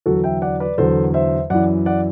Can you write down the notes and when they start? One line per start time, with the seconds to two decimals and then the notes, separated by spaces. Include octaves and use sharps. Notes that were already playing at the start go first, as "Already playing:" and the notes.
0.06 E2 D3 F#3 F#4 A4
0.24 E5 G5
0.42 D5 F#5
0.60 B4 D5
0.78 E2 D3 F#3 A4 C5
1.14 C5 E5
1.50 F#2 E3 D5 F#5
1.86 D5 F#5